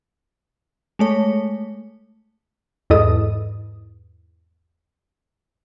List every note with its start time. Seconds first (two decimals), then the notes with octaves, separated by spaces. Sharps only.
0.99 G#3 A3 C#5
2.90 E2 G#2 E4 A4 D#5 D#6